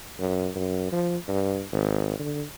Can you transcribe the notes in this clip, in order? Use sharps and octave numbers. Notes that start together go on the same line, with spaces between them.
F#2
F#2
F3
G2
G#1
D3